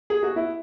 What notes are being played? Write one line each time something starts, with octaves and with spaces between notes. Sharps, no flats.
G#4
F#4
E4